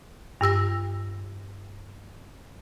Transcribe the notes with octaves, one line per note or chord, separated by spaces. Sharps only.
G2 G4 E6 A#6